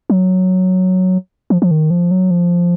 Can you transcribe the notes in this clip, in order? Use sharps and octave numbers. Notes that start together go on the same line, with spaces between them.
F#3
F3
F3
D#3
F3
F#3
F3